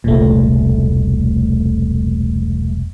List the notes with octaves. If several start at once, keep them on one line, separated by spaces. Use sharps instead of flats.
E1 C2 A#2 A3